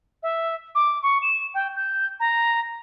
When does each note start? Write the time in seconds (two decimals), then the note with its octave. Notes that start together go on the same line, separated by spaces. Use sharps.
0.23 E5
0.75 D6
1.03 C#6
1.22 E7
1.54 G5
1.76 G6
2.20 A#5